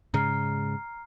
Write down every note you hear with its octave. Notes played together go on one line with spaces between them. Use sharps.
G#2 C#3 G#3 A#5 F6 C7